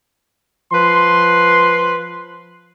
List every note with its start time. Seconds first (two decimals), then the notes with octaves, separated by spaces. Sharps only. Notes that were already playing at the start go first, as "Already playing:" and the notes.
0.72 F3 B4 C6